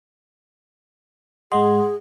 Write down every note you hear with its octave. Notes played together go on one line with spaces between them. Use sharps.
G#2 G#3 G#4 D#5 F#5 C6